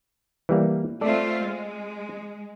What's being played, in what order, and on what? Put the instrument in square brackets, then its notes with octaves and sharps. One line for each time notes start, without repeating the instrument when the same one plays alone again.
[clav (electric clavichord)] E3 G3 A#3
[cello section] A3 C4 F4 [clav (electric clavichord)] A4 D5
[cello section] G#3